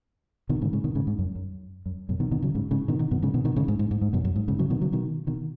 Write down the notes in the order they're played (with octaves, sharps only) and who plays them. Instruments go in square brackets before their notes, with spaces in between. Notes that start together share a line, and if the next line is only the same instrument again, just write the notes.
[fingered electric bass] B2 D#3
G#2 C#3
G#2 C#3
B2 D#3
G#2 C#3
G#2
F#2
F#2
F#2
F#2 B2
B2 D#3
B2 D#3
C#3 F#3
G#2 C#3
G#2 C#3
B2 D#3
B2 D#3
F#2 B2
G#2 C#3
B2 D#3
B2 D#3
G#2 C#3
G#2
G#2
G#2
G#2
F#2 B2
F#2
G#2
G#2 C#3
C#3 F#3
B2 D#3
C#3 F#3
B2 D#3
B2 D#3